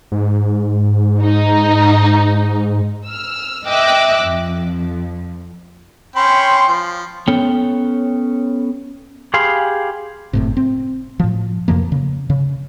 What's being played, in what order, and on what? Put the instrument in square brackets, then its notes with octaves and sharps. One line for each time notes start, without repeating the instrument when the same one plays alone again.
[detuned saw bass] G#2
[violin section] D#4
[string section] E6 F6
D#5 E5 G5 D6 E6 F#6
F2
[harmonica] C#4 G5 B5 [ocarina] C6
[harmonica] F3
[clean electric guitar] B3 C#4 A4 C#5 G5
[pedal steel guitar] G4 G#4 F5 B5 C6
[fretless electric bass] F#1 A2 C3
C4
A2 F3
F2 C3 F3 A#3
C#3
C#3